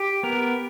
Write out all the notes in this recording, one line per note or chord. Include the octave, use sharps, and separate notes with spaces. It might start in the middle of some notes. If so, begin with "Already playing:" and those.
Already playing: G4
B3 A#4